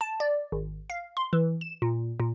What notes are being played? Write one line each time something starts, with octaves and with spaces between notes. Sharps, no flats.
A5
D5
G#1
F5
C6
E3
E7
A#2
A#2